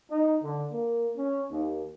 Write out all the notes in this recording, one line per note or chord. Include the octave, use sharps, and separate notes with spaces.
D#4
D3
A#3
C#4
D#2